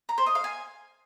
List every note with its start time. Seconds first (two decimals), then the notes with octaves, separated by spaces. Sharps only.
0.09 A#5
0.18 C5
0.26 D#5
0.35 F5
0.44 G#5